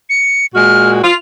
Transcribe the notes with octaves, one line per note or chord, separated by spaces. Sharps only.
C#7
A#2 G#3 F#4 F6
F4 F7